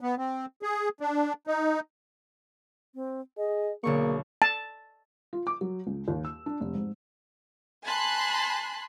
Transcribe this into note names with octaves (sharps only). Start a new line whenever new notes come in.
B3
C4
G#4
D4
D#4
C4
G#4 D#5
B1 D3 A#3 G#4 C#6
A5
F4
D6
F#3
C#2
D#2
E6
D4
F1
G#2
G#5 A5 B5 C6 F#6